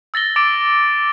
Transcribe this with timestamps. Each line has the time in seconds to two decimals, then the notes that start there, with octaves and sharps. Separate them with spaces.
0.14 E6 A6 A#6 G7
0.36 D6 A6 D7